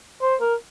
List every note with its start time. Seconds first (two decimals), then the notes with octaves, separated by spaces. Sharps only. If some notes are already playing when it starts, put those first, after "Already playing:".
0.22 C5
0.41 A#4